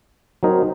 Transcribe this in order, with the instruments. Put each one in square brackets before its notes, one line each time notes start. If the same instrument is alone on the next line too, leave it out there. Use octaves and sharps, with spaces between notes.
[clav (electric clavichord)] F#3 C4 D#4 A#4 C#5